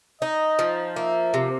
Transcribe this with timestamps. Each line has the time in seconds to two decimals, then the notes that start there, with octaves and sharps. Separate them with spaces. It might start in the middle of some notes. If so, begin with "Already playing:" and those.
0.21 D#4 D#5
0.59 F3
0.96 A#3 E5
1.34 C3